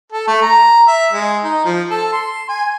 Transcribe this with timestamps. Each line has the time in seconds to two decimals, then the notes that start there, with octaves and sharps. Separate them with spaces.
0.12 A4
0.27 A3
0.42 A#5
0.88 E5
1.13 G#3
1.44 D#4
1.65 F3
1.90 A4
2.12 C6
2.49 G#5